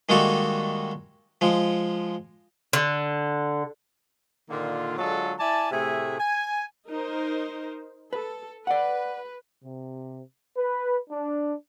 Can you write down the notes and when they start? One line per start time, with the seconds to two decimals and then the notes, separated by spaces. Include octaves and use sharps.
0.09 D#3 G3 G#3 A#3 F#4 A4
1.41 F3 G#3
2.73 D3
4.49 A#2 D3 D#3 A#3 F4
4.98 D3 F#3 G#3 F4 A4
5.38 E4 D5 G#5 A5
5.70 A2 C3 A3 G#4 E5
6.18 G#5
6.90 D#4 A#4 C5
8.13 A4 B4
8.67 B4 D5 F#5
9.64 C3
10.56 B4
11.10 D4